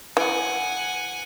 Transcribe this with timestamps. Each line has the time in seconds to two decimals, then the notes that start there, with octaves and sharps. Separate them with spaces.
0.17 E3 F#5 G#5